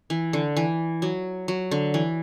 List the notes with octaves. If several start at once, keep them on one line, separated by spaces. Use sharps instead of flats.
E3
D3
E3
F#3
F#3
D3
E3